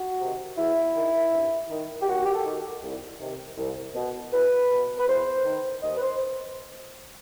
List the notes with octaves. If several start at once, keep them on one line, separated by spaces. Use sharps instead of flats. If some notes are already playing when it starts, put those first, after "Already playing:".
Already playing: F#4
C3 D#3
E2 E4
D#3
G2
D#3
G4
D#2 F#4
G4
A4
D#3
C2
C3 D#3
C2
B2
E2 B4
B2
B4
E2 C5
D#3
D#2 D#5
B4
C5